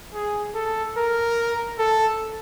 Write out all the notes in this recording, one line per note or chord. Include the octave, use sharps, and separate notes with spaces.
G#4
A4
A#4
A4